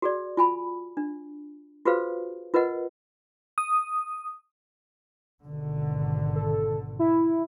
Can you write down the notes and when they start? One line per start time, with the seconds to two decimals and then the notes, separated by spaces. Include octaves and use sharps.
0.02 F#4 G#4 D5
0.37 F4 G#5 B5
0.97 D4
1.85 F4 F#4 G#4 B4 C5 F5
2.54 F4 A#4 B4 D#5 F#5
3.58 D#6
5.47 G#1 B2 D3
6.36 A4
6.99 E4